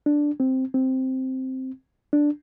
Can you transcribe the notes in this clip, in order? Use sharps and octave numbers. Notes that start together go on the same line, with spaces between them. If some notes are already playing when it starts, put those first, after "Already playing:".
D4
C4
C4
D4